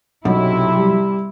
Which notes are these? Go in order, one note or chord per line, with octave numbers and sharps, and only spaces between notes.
B1 F#2 C3 E4
G3